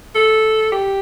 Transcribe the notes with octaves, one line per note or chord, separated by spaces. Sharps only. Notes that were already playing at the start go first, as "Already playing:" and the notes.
A4
G4